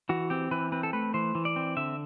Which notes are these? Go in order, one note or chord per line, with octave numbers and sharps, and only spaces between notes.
E3 F#4
C4 G4
E3 B4
C4 B4
A4
A3 B4
E3 C5
E3
D5
C4
D3 E5